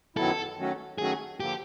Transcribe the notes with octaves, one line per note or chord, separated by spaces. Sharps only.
F#2 D#3 F#3 B3 E4 A4
D#3 F#3 A3 C#4 F#4
D#3 F#3 A3 C#4 F#4 G#4
D3 F3 A#3 G4